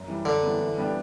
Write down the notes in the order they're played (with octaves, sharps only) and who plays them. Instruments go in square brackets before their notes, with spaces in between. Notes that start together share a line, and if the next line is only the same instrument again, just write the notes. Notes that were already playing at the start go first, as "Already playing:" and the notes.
Already playing: [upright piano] F#2
E3 G3
[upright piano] F#2 [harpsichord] D3
[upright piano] E3 G3 B3
E3
G3 B3 D4 G4